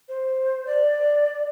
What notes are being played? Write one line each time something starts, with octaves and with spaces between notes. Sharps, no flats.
C5
D5